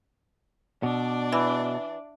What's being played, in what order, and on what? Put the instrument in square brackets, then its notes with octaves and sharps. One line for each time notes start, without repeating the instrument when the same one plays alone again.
[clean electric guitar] B2 [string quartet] D4 D5
[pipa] E3